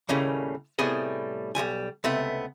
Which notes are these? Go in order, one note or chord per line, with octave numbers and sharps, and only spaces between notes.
D#2 A2 C#3 G3 A#3 C#4
A2 C3 G3 B3 G#4 D#5
B1 B2 G3 G#5
C#2 C3 A3 B3